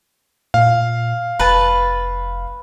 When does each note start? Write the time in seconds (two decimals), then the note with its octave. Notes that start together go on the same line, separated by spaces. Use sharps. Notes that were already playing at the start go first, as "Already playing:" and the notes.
0.54 A#2 F5
1.40 F1 B4 A5